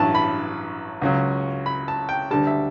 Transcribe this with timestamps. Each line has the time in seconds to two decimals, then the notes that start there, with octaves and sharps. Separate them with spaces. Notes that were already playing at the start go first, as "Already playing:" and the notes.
Already playing: A1 G2 F#3 A5
0.15 B5
1.02 C#2 C#3 F#3
1.66 B5
1.88 A5
2.09 G5
2.31 D2 D3 G3 A5
2.47 E5